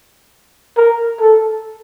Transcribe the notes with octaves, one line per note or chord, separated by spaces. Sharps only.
A#4
A4